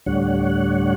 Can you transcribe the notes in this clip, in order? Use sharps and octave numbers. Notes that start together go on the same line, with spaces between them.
D2 A2 G3 D4 C#5 F#5